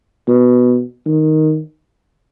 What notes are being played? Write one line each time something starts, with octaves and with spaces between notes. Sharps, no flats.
B2
D#3